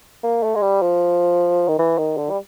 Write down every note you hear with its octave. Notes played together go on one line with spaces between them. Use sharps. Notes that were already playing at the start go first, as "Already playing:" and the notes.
A#3
A3
G#3
G3
F3
D#3
E3
D#3
D3
G3